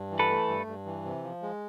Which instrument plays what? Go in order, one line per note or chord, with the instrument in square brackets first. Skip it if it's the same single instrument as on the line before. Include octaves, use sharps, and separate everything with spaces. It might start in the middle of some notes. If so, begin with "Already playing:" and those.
Already playing: [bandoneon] G2
E3
[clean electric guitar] A4 B4
[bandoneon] A3
G2
G2
E3
C3
F3
G#3